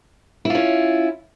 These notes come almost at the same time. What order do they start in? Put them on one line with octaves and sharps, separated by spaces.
E4 F4 C#4